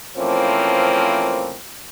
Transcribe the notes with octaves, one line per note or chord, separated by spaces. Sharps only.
E3 F3 A3 A#3 C4 C#4